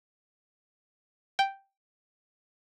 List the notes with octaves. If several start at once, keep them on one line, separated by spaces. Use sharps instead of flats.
G5